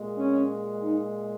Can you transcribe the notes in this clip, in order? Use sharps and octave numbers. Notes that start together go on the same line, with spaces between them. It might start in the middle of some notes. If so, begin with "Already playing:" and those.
Already playing: A#2 G#3
C#4
D#4